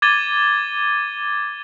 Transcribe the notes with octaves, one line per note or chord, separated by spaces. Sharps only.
D6 G#6 A6 D#7 G7